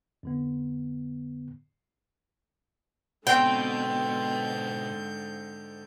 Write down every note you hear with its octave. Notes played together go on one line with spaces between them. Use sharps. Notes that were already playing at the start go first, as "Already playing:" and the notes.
F2 D3 B3
G#2 B2 D3 C4 G5 G6